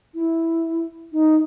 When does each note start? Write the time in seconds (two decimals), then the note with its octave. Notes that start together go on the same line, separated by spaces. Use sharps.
0.14 E4
1.13 D#4